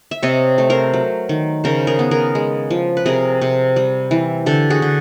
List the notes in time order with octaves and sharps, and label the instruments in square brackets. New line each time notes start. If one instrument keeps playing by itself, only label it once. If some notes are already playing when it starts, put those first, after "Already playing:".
[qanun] E5
C3 C#5 D#5
A3
A#4 C5
F#3
D#3
C#3 A#4 C5
G#4 A#4
B3
G#4 A#4
G#3
F3
B4
C3 G#4 A#4
C3
G3
E3
D3 G4 A4
F#4 G#4
D3